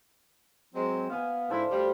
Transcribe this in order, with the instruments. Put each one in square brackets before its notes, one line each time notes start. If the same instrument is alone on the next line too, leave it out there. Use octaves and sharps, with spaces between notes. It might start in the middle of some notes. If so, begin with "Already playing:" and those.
[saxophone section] F#3 G#3 C4
[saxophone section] B3 [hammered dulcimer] F5 G#5
[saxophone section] G#2 D4 E4 [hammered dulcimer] A4 C5
[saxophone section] D2 D3 G3